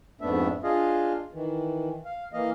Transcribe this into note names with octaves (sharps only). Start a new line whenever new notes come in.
F2 G#2 A3 B3 D4 E5
D4 F4 G#4 D#5 F5
D#3 E3
F5
E3 A#3 D#5 F5